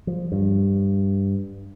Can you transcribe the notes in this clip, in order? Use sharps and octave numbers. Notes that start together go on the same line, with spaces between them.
F3
G2